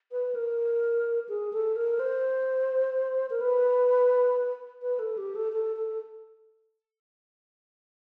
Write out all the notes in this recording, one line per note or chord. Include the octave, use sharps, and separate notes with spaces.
B4
A#4
G#4
A4
A#4
C5
A#4
B4
B4
A4
G4
A4
A4
A4